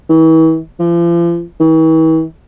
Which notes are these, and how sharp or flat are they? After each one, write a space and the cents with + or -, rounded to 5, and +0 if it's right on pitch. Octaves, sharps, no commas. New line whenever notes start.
E3 -40
F3 -40
E3 -45